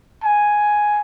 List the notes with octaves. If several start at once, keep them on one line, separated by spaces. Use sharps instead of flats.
G#5